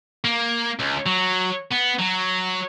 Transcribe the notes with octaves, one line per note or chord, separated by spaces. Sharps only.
A#3
C#2
F#3
B3
F#3